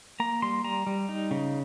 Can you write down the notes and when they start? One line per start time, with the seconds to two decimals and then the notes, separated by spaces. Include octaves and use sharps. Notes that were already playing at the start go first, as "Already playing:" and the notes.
0.20 A#3 A#5
0.42 G3 C6
0.64 G3 A#5
0.87 G3
1.09 D#4
1.31 C#3